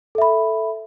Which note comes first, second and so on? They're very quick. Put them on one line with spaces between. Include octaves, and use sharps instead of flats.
A4 E5 B5